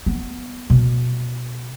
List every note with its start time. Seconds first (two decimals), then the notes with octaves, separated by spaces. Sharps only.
0.06 B3
0.70 B2